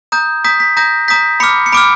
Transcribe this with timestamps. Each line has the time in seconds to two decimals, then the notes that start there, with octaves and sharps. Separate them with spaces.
0.12 A#5 D#6 G6
0.45 A#5 D#6 G6 B6
0.60 B6
0.77 A#5 D#6 G6 A#6
1.08 A#5 D#6 G6 B6
1.40 B5 D6 F6 C#7
1.66 C#7
1.72 B5 D6 F6 D7